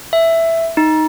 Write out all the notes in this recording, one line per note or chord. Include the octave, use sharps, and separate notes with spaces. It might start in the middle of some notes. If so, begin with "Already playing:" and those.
E5
D#4